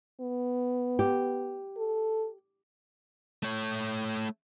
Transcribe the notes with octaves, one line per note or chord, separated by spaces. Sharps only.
B3
G4
A4
A3 C#5